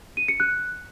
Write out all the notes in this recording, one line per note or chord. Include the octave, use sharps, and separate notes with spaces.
D#7
C#7
F#6